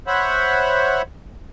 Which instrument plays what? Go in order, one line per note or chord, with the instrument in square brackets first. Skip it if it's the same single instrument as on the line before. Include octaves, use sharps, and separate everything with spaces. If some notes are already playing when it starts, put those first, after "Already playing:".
[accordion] C5 C#5 E5 F#5 B5